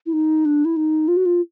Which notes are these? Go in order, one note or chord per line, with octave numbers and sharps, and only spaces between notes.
E4
D#4
D4
E4
D#4
F4
F#4
F4